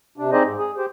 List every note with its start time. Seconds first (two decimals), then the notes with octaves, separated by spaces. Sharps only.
0.18 C3 D4
0.32 C4 D#4 G#4 C5 D5 D#5
0.45 G#2
0.58 G#4
0.77 G4 C5